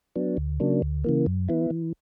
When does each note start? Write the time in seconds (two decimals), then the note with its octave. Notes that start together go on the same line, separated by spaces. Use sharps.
0.16 F#3 B3 D4
0.37 D2
0.60 C#3 F#3 A#3 D4
0.82 D2
1.04 C#3 E3 A#3
1.26 F#2
1.49 E3 B3 E4
1.70 E3